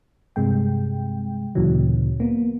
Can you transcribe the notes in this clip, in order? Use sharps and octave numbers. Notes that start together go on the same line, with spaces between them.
G2 C3 G#3 G5
D2 A#2 C#3 E3 F#3
A#3 B3